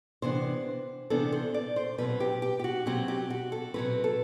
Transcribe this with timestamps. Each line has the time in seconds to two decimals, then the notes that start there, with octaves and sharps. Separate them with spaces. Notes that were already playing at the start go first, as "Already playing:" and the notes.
0.22 C3 E3 B3 D4 C5
1.10 C3 E3 B3 D4 A4
1.32 C5
1.54 D5
1.76 C5
1.98 B2 F#3 C4 B4
2.20 G4
2.42 G4
2.59 G4
2.64 F#4
2.86 B2 F#3 C4 G4
3.08 G4
3.30 F#4
3.52 A4
3.74 B2 F#3 C4 B4
4.04 A4